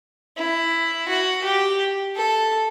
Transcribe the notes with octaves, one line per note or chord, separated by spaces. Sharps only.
E4
F#4
G4
A4